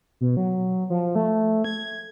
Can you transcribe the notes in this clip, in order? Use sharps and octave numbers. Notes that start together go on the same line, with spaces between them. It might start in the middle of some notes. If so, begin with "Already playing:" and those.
B2
F#3
F3
A3
G#6